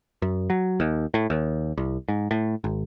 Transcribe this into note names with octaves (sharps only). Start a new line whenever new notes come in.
F#2
F#3
D#2
A2
D#2
C2
G#2
A2
G#1